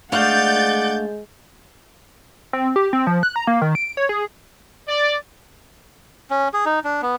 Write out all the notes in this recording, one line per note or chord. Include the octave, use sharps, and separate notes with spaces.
G#3 A3 D4 D5 F5 F#5 G6 A6
C4
G4
C4
F3
F#6
A#5
A#3
D#3
D7
C#5
G#4
D5
C#4
G#4
D#4
D4
B3